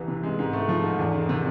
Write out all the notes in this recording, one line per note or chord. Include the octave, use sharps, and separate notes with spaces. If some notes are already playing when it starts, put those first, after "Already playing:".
Already playing: C2 E3
C3
G#3
G#2
A3
F3
G#2
E2
D#3
C3